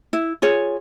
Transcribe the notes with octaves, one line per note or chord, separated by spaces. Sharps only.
E4
F4 G#4 C#5